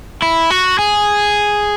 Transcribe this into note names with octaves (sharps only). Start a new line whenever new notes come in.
E4
F#4
G#4